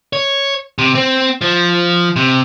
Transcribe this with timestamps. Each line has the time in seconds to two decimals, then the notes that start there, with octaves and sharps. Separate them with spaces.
0.13 C#5
0.78 C3
0.95 C4
1.41 F3
2.16 C3